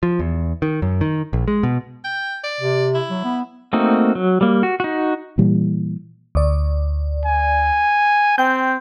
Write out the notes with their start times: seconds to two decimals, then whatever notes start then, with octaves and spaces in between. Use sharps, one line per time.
0.03 F3
0.19 E2
0.62 D#3
0.82 F#2
1.01 D#3
1.33 A#1
1.48 G#3
1.63 B2
2.04 G5
2.44 D5
2.61 C3
2.94 E4
3.10 F#3
3.24 B3
3.73 A3 A#3 C4 D#4 F#4
4.15 F#3
4.41 G3 A#3
4.63 F#4
4.80 D#4 F#4
5.38 A#2 E3 G3
6.35 D2 D5
7.26 G#5
8.38 C4 G5 G6